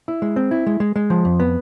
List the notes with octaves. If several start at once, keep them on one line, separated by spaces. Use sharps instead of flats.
E4
G#3
C4
E4
G#3
G#3
G#3
F3
F2
B3